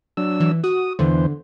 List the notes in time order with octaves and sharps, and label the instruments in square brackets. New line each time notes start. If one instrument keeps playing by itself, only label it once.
[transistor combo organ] F#3 D4 E6
[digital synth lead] E3
[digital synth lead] F#4 [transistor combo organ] D#6
[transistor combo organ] E2 E3 C5 [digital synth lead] D3